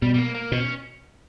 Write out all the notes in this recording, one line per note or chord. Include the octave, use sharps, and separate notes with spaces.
B2 G3
G3
A#3
A#3
B2 C#4